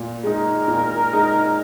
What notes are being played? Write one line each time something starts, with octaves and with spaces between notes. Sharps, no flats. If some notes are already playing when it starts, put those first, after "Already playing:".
Already playing: A#2
G#3 D#4 A#4
A#2
G#3 D#4